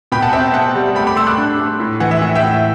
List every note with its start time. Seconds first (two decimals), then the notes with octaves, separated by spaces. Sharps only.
0.12 B2 G5 B5
0.22 F#5 A5
0.33 C4 E5 G5
0.53 C4 F#5 A5
0.75 G3
0.95 A3 G5 B5
1.06 B5 D6
1.16 A3 C6 E6
1.27 D6 F#6
1.38 D4
1.59 A3
1.80 A2
2.00 E3 F#5
2.11 E5
2.22 A2 F#5
2.35 E5 G5
2.43 A2